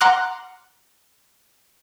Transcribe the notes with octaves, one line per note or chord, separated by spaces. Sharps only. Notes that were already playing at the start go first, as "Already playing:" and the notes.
F#5 A#5 C6 D6 F6 F#6